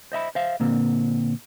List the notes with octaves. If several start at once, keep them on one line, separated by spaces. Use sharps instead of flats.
C5 D#5 E5 B5
C5 E5 F5
A#2 D3 A#3 C4